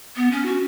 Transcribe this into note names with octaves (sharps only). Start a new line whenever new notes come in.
B3
C#4
F#4